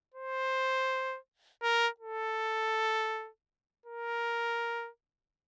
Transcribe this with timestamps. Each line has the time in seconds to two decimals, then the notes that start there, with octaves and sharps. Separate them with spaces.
0.14 C5
1.62 A#4
2.00 A4
3.86 A#4